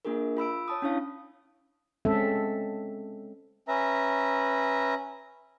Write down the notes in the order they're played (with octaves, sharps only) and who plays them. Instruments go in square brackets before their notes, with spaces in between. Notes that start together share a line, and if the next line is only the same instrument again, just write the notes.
[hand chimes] A#3 D4 F4 G#4 A#4
F4 B5 E6 D7
C#5 A5 D#6
C#4 D4 E4 C#5 F5
[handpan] G#3 C4 C#4 A4 E5
[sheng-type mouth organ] C#4 B4 E5 A#5